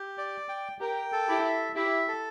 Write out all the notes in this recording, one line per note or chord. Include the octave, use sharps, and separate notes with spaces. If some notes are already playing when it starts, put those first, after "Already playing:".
Already playing: G4
D5
G5
G4 A#4 G5
A4
E4 G4
E5
E4 G4 E5
A4